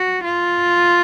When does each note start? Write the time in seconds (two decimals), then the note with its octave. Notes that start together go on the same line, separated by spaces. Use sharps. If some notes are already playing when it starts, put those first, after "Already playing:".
Already playing: F#4
0.24 F4